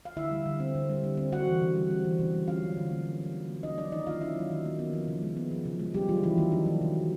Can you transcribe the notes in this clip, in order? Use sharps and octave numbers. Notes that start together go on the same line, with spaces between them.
F5
D3 E4 E5
G3
D3
C4
D3
G3
D3
C4
C4 F#4 F#5
E3
C#3
G3
C4
E3
C#3
G3
C#4 F4 F5
F#3
D3
A#3
C#4
F#3
D3
A#3
C#4 D#4 D#5
F#3 D4 D5
D#3 D#4 D#5
A#3 F4 F5
C#4 E4 E5
F#3
D#3
A#3
B3
F3
C#3
G#3
B3
F3
C#3
G#3
C#3 G3 G4
F3 F#3 F4
C#3 E3 E4
D#3 A#3 D#4
C#3 D4
F#3
C#3
A#3